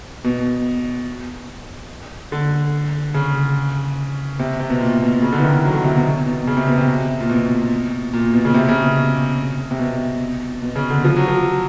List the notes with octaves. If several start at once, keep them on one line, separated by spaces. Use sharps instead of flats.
B2
D3
C#3
C3
C3
B2
A#2
B2
C#3
D3
E3
D#3
F#3
D3
C3
B2
B2
C#3
C3
B2
C3
A#2
B2
A#2
B2
C#3
C3
C#3
B2
C3
B2
B2
C#3
D3
F3
F#3
F3